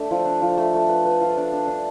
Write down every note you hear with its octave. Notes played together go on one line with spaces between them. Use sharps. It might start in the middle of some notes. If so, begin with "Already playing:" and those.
Already playing: A3 D4
F3
D4
F3
A3
A3
B4
B4
F4
D4
D4
D4